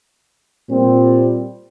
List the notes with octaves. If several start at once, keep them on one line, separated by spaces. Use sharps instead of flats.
A#2 G3 C4